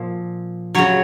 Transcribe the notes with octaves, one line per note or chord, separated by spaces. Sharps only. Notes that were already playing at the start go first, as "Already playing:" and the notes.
Already playing: A#2 F3
C#3 F#3 C#5